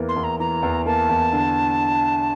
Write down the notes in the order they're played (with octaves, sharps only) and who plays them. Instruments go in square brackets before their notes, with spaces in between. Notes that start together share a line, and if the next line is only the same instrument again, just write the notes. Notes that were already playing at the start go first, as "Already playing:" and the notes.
Already playing: [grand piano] E2 E3 A#3
[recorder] C6
[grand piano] E2
[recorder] A#5
[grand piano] E3 [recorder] A#5
[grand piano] E2
[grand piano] A#3 [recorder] A5
[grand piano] E2
D3